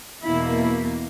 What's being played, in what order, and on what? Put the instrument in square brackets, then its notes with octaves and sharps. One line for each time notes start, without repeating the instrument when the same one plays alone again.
[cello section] E2 B2 A#3 E4